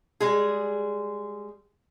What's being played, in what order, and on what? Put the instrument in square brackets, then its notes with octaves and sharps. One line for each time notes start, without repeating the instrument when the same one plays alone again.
[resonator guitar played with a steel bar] G3 G#3 G#4